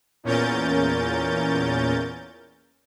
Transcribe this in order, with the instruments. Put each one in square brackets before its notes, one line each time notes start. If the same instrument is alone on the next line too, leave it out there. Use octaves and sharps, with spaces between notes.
[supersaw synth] E2 A#2 C#4 A#4 G6 A6